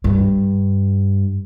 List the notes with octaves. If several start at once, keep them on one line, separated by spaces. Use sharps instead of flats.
G2